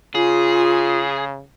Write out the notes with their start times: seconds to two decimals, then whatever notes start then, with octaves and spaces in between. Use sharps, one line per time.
0.15 C#3 F4 G#4